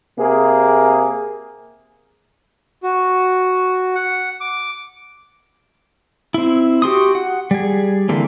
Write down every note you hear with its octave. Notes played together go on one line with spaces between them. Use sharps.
C3 A#3 G#4
F#4
F#5
D6
C4 E4
F#4 G4 C6 D#6
F#5
G3 G#4
D3 E3 A#3 C4